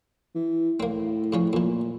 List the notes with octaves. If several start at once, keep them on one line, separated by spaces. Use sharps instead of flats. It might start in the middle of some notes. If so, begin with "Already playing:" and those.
E3
A2 A#3 C4
G#2 F3 C#4
F2 A#2 E3